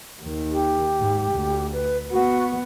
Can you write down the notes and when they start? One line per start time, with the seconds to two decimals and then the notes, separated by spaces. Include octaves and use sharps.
0.21 D#2 D#3
0.51 G4
0.99 G#2
1.32 D2
1.73 B4
2.12 B3 F#4